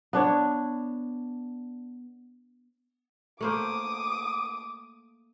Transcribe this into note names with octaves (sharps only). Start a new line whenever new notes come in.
B3 D4 C#5
A3 A#3 C5 D6 D#6